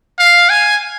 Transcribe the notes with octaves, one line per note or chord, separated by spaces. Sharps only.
F5
G#5